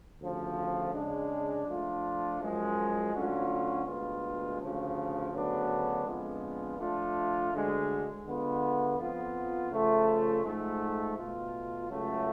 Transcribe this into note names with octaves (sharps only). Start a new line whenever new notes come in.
D2 C#3 F3
C#3 G#3 D4
F3 A3 D4 F4
F#2 F3 G#3
D2 D3 F#3 C#4 F4
D2 D3 G#3 B3 F4
D2 C#3 F3
D2 C#3 F#3 B3 D4
F2 D3 G#3 B3 F4
F3 A3 D4 F4
D2 D3 G#3
D3 G#3 B3 F4
F2 F3 B3 F4
C#3 F3 A3 F4
G#2 F3 A3
B2 A3 F4
C#2 C#3 F#3 A3